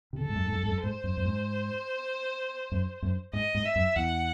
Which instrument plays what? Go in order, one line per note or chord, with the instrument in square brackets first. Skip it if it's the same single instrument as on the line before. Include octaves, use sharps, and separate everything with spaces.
[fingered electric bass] C3
[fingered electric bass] C#3 [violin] A4
[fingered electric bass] G#2
F#2
G#2
F#2
G#2
F#2
[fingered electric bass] G#2 [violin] C5
[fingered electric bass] F#2
F#2
G#2
F#2
F#2
[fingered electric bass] G#2 [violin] D#5
[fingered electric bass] G#2
[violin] E5
[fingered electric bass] F#2
[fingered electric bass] E2 [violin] F#5